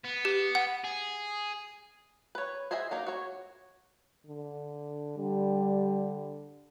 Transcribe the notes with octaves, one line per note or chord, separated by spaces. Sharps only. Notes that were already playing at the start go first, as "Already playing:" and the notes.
B3
G4
F#5
G#4
B4 C#5
G#4 C5 D#5 E5 G#5
F#3 A#3 D#4
F#4 C#5
D3
D3 G3